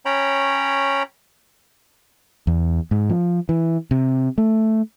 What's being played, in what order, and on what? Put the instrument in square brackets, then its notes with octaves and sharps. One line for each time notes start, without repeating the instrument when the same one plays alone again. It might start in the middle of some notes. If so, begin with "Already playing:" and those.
[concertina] C#4 C#5 G5 A#5 B5
[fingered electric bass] E2
G#2
F3
E3
C3
A3